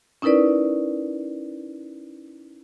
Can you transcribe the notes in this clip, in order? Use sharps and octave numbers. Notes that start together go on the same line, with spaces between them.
C#4 D#4 E4 A#4 B4 D5